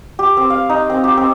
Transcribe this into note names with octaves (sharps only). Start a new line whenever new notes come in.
G4
C4
F5
D#4
C4
G4
C4